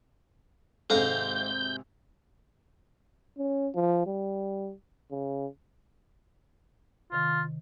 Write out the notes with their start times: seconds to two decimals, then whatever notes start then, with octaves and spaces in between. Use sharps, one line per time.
0.90 G#1 G#2 C3 G#3 A4 F5 A#5 G6
3.38 C#4
3.75 F3
4.07 G3
5.11 C#3
7.12 C3 D#3 F4